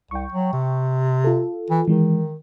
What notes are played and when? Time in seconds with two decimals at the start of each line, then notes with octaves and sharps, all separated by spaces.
0.11 C2 G5 C#6
0.32 F#3
0.53 C3
1.24 F4 A4
1.70 E3
1.88 D#3 E3 G#3